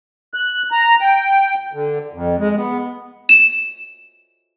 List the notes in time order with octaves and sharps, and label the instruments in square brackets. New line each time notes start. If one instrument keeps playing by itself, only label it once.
[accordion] F#6
A#5
G5
D3
F2
G#3
B3
[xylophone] E7